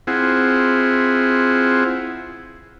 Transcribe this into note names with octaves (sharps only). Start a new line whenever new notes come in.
C4 E4 F4 G#4 F#5